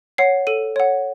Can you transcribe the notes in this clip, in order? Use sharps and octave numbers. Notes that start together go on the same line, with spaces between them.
C#5 F#5 C7
A4 D#7
C#5 F#5